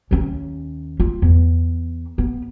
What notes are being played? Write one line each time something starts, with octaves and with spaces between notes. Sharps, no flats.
D#2 C#4
F4
E2
B3